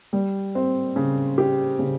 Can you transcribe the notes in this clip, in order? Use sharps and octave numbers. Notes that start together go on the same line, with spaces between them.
G3
C4
C#3
G4
C#3